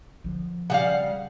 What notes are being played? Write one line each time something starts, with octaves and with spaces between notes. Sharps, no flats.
D3 F3
C#3 G3 F5 F#5